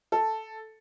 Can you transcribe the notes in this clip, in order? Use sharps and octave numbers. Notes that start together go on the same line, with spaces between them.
A4